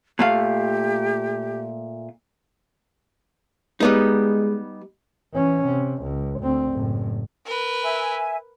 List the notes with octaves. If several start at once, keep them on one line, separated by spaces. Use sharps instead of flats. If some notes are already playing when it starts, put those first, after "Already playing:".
A#2 A3 G4 F5
G3 G#3 B3 D#4
E3 C#4
C3
C#2
D2 C4
F#1 A2
A#4 B4
E5 G#5